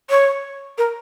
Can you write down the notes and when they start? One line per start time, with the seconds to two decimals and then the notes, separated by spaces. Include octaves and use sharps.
0.10 C#5
0.78 A#4